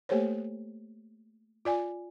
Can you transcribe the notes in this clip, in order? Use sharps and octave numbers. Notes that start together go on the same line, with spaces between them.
A3 A#3 G4 A4 C5 C#5
F4 D5 G#5